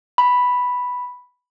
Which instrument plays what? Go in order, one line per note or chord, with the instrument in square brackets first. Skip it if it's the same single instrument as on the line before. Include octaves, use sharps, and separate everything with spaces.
[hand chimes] B5